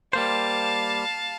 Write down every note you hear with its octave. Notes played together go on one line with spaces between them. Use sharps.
G3 A#3 C5 F5 A5